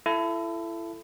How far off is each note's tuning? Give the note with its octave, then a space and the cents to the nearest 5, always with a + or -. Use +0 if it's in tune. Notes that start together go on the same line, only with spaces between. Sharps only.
E4 +30 A4 +0